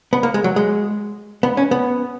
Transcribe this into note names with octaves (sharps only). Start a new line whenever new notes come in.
B3
A#3
G#3
F#3
G#3
B3
C#4
B3